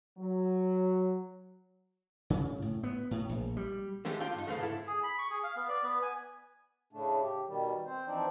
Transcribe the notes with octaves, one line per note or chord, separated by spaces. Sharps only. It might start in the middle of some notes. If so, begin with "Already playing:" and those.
F#3
C#3
A2
B3
A2
A#1
G3
D3 D#3 G#3 A3 D#4 G4
A#3 D4 F4 F5 G5
G2 D#4
D#2 D3 A3 G#4 B4 F5
G#2 E4 A4
G#4
B5
C#6
G#4
F5
B3
D5
B3
G#5
A2 C#3 A3 D4
G4
B2 D#3 G3
C4 C5
E3 F3 C4 D4 D#4 D5